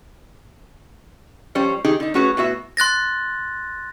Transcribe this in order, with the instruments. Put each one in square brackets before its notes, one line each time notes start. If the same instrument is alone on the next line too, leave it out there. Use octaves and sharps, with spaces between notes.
[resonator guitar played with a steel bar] F3 G3 C#4 C5 C#5
D#3 D#4 G4 G#4
D3 D#4
A3 C#4 F#4 G#4 B4 C#5
A2 B3 F#4 E5
[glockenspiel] C6 F#6 A6 A#6